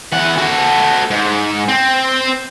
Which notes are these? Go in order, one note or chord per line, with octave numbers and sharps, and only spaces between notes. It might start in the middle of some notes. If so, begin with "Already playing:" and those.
E2 F#5
F#4 A4
G#2
C4